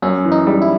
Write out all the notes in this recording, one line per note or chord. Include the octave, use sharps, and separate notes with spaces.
F#2 C#4
E3
D#4
G3
E4